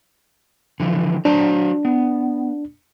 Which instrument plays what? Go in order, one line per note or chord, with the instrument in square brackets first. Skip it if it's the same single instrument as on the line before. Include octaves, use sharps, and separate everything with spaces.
[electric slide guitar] D3 E3 F3
[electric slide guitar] F#3 C5 A#5 [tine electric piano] D4
[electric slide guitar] B3